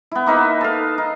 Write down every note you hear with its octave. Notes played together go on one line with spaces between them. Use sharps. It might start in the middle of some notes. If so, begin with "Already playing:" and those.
B3 E4
A#3 D#4 B4 E5
A4 F5
D#4